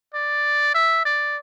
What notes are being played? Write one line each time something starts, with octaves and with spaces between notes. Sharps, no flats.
D5
E5
D5